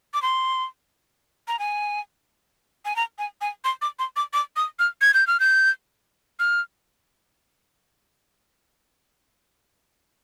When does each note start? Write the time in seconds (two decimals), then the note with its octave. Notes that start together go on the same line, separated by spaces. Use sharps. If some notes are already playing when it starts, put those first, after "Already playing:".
0.14 D6
0.22 C6
1.48 A#5
1.59 G#5
2.85 G#5
2.96 A#5
3.19 G#5
3.41 G#5
3.64 C6
3.82 D6
3.99 C6
4.16 D6
4.33 D6
4.56 D#6
4.79 F6
5.01 G#6
5.14 G6
5.27 F6
5.40 G6
6.40 F6